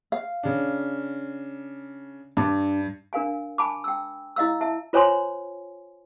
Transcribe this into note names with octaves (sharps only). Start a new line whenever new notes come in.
F5
C#3 D4
G2 D4
D4 A#4 F5 G#5
G#5 A5 B5 D6
G5 E6
E4 D#5 F5 E6
E5 A5
F4 C5 C#5 G#5 A#5 C6